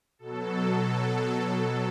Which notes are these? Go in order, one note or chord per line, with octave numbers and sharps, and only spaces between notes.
B2 F#3 A4